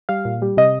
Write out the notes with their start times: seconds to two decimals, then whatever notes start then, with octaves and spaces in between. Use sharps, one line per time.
0.09 G3 F5
0.25 A#2
0.42 G3
0.57 C3 D#5